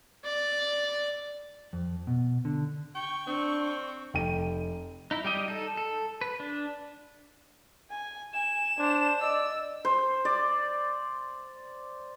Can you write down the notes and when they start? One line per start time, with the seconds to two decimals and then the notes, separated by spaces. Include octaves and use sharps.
0.24 D5
1.73 F2
2.07 B2
2.45 D3
2.95 G5 C#6
3.27 C4 D4
4.14 F1 G5 D#7
5.11 D#4 E4
5.24 G3 G4 D#5
5.48 D#4 A4
5.77 A4
6.21 B4
6.40 D4
7.90 G#5
8.33 G#5 E7
8.78 D4 C5
9.20 D5 D#5 E6
9.85 C5
10.25 D5